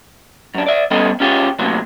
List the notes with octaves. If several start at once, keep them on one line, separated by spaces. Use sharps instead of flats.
F#2 D4
D5 E5
G3 B3 C#4 A4 C5 D#5
C#4 F4 G4 G#4 C#5
F#2 A2 C3 F#3 A#3